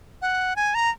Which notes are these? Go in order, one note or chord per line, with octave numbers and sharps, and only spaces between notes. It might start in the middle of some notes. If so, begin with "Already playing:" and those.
F#5
G#5
A#5